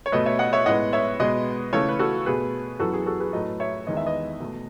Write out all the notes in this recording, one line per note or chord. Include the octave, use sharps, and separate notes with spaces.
C#5
B2 A3 B4 D#5
C#5 E5
D#5 F#5
C#5 E5
A2 G#3 B3 D#5 F#5
C#5 E5
B2 G#3 B3 B4 D#5
C#3 E3 A3 A4 C#5
B4
F#4 A4
B2 A3 G#4 B4
F#2 E3 B3 F#4 A4
G#4
F#4 A4
G#4 B4
A2 F#3 A3 B4 D#5
C#5 E5
E2 D#3 G#3 B3 D#5
E5
B4 D#5
B2 A3